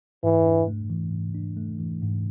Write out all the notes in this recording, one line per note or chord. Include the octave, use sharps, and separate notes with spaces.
G#2 E3
D4
A3
E3
G#2
D4
A3
E3
G#2